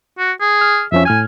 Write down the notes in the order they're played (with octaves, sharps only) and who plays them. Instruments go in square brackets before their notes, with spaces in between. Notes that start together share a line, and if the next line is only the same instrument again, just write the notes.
[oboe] F#4
G#4
[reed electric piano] F6
[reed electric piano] F2 F3 C#4 [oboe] E5
[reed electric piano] A2 F6 G#6 [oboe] G#5